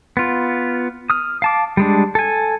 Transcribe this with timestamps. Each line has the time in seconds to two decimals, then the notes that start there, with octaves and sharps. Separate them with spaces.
0.17 B3 F4
1.10 D#6 F6
1.42 F5 A5 D6
1.77 G3 G#3 D4
2.15 A4 G#5